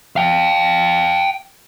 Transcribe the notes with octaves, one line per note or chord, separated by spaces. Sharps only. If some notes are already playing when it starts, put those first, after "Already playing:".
F5 G5